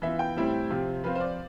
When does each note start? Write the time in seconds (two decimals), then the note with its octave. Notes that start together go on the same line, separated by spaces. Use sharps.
0.02 E3 B3 F4 E5
0.19 G5
0.37 A2 G3 C4 E4
0.70 C3 F3 C4
1.04 F3 C4 F4 B4
1.15 C5
1.20 D5